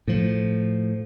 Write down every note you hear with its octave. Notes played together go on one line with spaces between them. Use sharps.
A2 F3